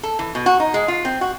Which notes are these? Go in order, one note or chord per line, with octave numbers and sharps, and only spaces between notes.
A4
E3
B2
F#4
D#4
G#3
F4
C4
F#4